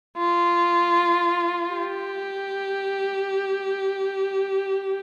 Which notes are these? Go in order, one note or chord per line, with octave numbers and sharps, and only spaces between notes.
F4
G4